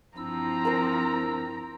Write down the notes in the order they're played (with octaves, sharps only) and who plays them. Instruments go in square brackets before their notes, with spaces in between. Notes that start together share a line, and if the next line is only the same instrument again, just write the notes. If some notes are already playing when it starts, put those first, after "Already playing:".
[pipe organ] G2 E4 E6 [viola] F3 C4 [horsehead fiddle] A#5
[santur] A#4 C5